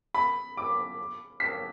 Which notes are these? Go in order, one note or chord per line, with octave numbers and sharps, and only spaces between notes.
B5
D6
B6